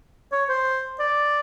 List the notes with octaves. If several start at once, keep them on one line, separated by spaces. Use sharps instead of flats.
C#5
C5
D5